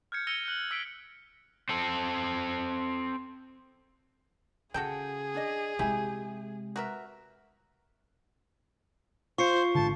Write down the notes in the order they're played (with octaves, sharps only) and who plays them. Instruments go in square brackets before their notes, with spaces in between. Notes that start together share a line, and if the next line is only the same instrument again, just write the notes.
[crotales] F6 G6 G#6 C#7
E6 A#6 C#7 D#7 F7 G7
F#6 F#7
E6 B6 C#7 D7
[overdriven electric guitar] C4 A4
[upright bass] C#3 [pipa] F#4 A4 G5 [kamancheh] G#4
[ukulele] D4 D5 D#5
[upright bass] C3 G#3 [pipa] E4 [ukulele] G4 E5 G#5
[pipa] F#4 A#4 E5 [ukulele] B4
[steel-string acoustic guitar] F4 [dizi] C5 [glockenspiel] C#6 C7 C#7
[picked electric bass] G#1 D3 [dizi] A5